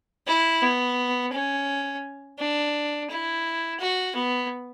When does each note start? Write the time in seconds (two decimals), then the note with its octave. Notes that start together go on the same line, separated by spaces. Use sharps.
0.27 E4
0.62 B3
1.32 C#4
2.39 D4
3.10 E4
3.80 F#4
4.15 B3